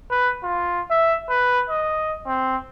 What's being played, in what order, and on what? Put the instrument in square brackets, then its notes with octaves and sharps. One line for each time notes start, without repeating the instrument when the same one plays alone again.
[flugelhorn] B4
F4
E5
B4
D#5
C4